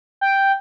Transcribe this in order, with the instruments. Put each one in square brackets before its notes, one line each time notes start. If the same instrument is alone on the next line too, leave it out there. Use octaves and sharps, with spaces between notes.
[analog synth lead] G5